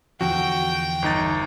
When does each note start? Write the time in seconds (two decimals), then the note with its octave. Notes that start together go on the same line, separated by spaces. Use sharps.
0.21 E2 D3 F3 F#4 G5
1.02 G1 D#4 A6